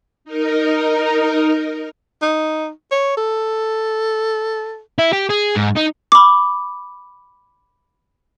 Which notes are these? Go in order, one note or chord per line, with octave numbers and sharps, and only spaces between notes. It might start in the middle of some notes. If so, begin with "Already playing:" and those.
D#4 A#4
D#4
C#5
A4
E4
G4
G#4
G#2
D#4
B5 D6